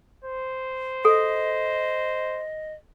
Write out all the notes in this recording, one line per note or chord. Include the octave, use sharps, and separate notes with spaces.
C5
A4 D#5